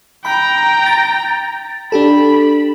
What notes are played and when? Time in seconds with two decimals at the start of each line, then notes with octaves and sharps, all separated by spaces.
0.25 G5 A#5 B5
0.86 A6
1.92 D4 G4 A4 B5